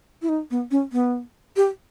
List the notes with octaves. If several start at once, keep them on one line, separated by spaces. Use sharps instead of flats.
E4
D#4
B3
C#4
B3
G4